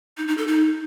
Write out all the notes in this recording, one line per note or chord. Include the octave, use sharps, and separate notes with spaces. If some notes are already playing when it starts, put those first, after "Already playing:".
D#4
D#4
A4
D#4